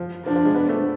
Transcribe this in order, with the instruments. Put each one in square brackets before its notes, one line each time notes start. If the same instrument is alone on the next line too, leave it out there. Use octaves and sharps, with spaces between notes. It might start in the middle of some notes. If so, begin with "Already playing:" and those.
Already playing: [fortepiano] F3
[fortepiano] F3 [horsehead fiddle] D4
[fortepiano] F3
G#3
B3
A3